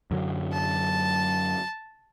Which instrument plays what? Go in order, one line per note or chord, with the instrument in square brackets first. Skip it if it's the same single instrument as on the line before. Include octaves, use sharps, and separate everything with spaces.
[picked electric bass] F#2 D3 F#3
[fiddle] A5